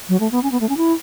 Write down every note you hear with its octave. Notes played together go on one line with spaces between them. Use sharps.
F#3
A3
B3
C#4
B3
A3
C#4
E4